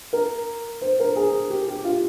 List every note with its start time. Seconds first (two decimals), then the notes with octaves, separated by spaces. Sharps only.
0.13 A#4
0.81 C5
0.99 A#4
1.16 G#4
1.50 G4
1.68 G4
1.84 F4